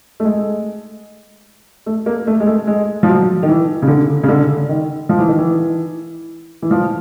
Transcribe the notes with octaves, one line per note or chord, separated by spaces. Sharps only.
A3
G#3
A3
A#3
A3
G#3
A3
G#3
F3
F#3
D#3
E3
C#3
D3
C#3
D3
D#3
F3
E3
D#3
E3
E3
F3